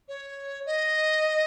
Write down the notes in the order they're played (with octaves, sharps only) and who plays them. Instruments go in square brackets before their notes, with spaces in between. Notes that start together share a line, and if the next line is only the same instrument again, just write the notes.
[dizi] C#5
D#5